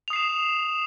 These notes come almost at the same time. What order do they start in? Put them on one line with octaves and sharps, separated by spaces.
F7 D#6 C7 E7